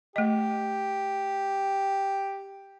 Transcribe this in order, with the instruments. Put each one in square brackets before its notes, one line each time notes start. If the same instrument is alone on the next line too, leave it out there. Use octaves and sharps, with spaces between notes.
[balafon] A3 D#5 [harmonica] G4